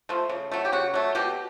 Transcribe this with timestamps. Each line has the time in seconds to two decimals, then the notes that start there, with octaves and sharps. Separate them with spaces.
0.09 F3 A3
0.29 C#3
0.51 F#3 A3
0.65 G4
0.72 C#3 F#4
0.94 F#3 A3
1.15 B2 G4